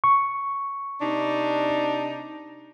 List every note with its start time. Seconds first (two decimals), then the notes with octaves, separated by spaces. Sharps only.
0.04 C#6
1.02 C3 D4 D#4